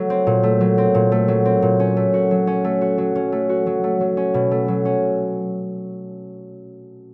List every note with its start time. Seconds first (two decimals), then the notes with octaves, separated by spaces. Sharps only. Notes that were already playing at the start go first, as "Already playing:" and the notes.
Already playing: F#3 A3
0.10 C4
0.27 A#2
0.43 A3
0.61 F#3
0.78 C4
0.95 A#2
1.12 A3
1.28 F#3
1.45 C4
1.62 A#2
1.80 C#4
1.97 A3
2.14 F#4
2.31 F#3
2.47 C#4
2.64 A3
2.81 F#4
2.98 F#3
3.15 C#4
3.32 A3
3.49 F#4
3.67 F#3
3.84 A3
4.01 F#3
4.17 C#4
4.34 B2
4.51 A3
4.68 F#3
4.85 C#4